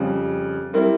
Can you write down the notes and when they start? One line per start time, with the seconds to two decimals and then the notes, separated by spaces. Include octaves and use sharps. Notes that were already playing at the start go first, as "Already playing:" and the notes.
Already playing: F2 C#3 G3
0.74 G3 C4 E4 A#4